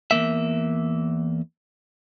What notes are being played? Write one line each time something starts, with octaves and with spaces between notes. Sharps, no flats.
E2 G#2 A#3 E5